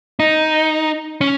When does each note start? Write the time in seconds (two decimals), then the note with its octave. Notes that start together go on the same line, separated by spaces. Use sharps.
0.20 D#4
1.21 C#4